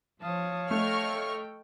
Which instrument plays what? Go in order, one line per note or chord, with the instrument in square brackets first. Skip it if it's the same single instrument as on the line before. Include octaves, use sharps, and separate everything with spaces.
[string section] F3 [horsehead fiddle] C#5 F5 [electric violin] A5 D#6
[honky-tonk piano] A3 [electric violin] A4 G5 [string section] D#5 C#6 F6